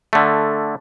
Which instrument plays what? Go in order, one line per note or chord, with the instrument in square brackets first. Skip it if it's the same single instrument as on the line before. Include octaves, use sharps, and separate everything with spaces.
[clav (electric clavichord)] D3 A3